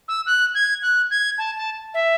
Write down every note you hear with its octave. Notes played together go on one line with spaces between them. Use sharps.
E6
F#6
G#6
F#6
G#6
A5
A5
E5